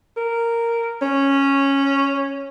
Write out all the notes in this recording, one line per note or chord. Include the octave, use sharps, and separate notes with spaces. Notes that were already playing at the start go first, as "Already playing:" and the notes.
A#4
C#4